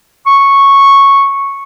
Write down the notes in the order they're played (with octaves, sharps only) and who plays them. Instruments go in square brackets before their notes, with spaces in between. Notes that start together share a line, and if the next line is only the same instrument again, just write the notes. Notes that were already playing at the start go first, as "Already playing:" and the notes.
[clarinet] C#6